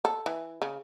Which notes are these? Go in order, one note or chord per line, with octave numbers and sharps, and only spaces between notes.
A4
E3
C#3